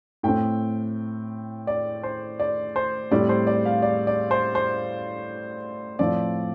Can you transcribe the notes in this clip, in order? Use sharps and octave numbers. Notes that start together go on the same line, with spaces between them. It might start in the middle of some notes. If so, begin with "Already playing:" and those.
A2 A3 C4 G5
D5
C5
D5
C5
A2 G3 C4 D5
C5
D5
F5
D5
D5
C5
C5
A2 F3 C4 D5